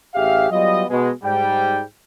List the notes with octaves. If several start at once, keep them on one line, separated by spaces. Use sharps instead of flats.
A1 G4 G#4 E5 F5
F#3 G3 B3 F4 D#5
B2 G#3
G#2 G3 G5